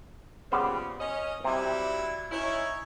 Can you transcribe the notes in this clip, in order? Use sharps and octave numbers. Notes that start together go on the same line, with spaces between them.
A#2 C#3 G3 B3 C5
C#4 D#5
C3 F#3 G3 E4
C#4 D#4 E4 C#5